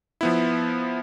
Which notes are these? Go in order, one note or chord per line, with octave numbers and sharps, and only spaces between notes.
F3 B3 E4